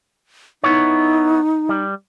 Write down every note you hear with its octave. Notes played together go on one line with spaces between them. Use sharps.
B3 D#4 E4 C#5
G3